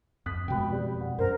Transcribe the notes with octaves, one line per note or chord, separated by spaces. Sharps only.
F2 D#6 F#6 B6
F2 B2 G#3 G5 B5
G3 G4
F#5
F#2 A#4 C5